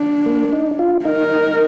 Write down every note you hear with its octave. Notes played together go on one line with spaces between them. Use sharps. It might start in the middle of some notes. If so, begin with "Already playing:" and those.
Already playing: D4
A#3
D#4
F4
D#4 A#4